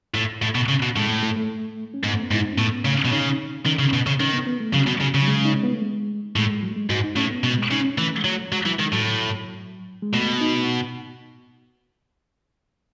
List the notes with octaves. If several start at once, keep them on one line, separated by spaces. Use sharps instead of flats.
A2
A2
B2
C#3
B2
A2 G#3
A3
A3
A3
C#4
G#2 B3
A3
B3
G#2
E4
D#4
C#4
A2 B3
B3
C#3 A3
C#4
B2
C#3 D#4
D#3 C#4
C#3
B2
C#3
D#3 C#4
B3
B3
A3
C#3 F#3
B2
C#3 F#3
C#3
F#3
G#3
D#4
C#4
B3
A3
G#3
A2 G#3
G#3
F#3
A3
G#3
G#2 F#4
D#4
A2 C#4
B3
B2 G#3
G#3
C#3 D#4
C#4
E3 A3
G#3
F#3 A3
F#3 G#3
E3 F#3
D#3 G#3
A2 F#3
G#3
B2 A3
D#4